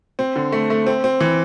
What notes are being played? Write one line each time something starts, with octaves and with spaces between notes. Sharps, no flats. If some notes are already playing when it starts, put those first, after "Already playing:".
C4
D3
A3
A3
C4
C4
E3